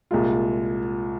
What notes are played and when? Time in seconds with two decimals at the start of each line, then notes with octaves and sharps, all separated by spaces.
0.11 C2 A#2 G#3 F4